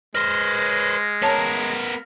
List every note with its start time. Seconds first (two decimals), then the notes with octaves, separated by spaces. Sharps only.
0.15 G#3 B4 C5 F6 A#6
1.22 B3 A#4 C#5 A5